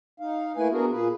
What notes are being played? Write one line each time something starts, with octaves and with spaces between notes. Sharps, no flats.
D#4 F5
A3 A#3 E4 B4 G#5
B3 D4 F#4 G#4 A#4
A#2 A#3 G#4 B4